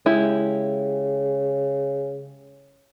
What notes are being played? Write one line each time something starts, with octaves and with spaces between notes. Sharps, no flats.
C#3 G#3 E4 G4